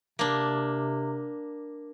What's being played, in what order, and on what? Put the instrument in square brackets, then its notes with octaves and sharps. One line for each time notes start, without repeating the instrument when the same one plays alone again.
[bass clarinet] C3 [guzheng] A#3 D4